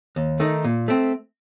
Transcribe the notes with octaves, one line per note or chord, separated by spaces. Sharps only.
D#2
D#3 A3 D#4
A#2
A3 C4